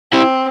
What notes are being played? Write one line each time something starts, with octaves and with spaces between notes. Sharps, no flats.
C4 E4 G4